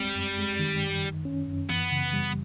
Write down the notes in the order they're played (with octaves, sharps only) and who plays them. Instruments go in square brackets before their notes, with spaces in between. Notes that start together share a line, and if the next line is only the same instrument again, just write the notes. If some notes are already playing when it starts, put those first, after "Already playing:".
Already playing: [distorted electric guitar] G3 [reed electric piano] G#3 C4
[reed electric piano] F#2
G#3
D#3
F#2
D#3
C#4
F#2
[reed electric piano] E3 [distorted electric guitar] B3
[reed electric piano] C#3
G3